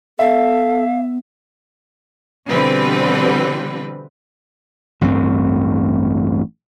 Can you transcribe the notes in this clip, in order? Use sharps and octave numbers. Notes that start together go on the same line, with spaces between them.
B3 A4 E5 F5
B2 D3 E3 G3 C4 B4
A1 D2 G2 C4